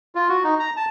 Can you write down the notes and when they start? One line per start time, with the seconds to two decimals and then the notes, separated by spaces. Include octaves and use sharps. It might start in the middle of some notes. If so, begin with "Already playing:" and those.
0.15 F4
0.29 F#4
0.44 D#4
0.60 A#5
0.77 A5